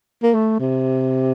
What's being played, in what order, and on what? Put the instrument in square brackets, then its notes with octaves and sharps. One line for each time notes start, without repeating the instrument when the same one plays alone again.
[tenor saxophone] A#3
A3
C3